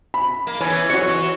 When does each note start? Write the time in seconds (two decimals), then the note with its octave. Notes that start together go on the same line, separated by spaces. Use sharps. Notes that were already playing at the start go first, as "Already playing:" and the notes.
0.14 B5
0.47 A#3
0.61 E3 B3 C#4
0.90 F#4 C#5
1.08 E3